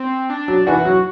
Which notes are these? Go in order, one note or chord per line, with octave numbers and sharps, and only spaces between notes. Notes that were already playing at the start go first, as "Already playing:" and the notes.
Already playing: C4
D4
F#3
E3 F#4
F#3